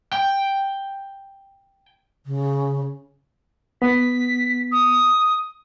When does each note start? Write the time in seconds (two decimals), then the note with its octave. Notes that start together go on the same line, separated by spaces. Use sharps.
0.13 G5
2.26 C#3
3.82 B3 B6
4.72 D#6